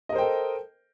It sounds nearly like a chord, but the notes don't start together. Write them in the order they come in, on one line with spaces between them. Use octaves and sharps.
D#5 A#4 C5 G5 A4